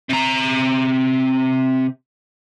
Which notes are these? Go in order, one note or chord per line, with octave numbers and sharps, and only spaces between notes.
C3 A#5